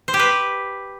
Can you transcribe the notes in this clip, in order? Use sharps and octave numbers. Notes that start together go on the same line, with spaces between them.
C5
G4
B4